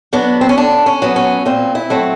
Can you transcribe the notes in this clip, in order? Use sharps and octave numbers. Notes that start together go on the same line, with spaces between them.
F#3 B3 D4
C4
C#4
D3 D4
C#4
F#3 B3
C#4
A#2 C4
E4
F#3 A3 C4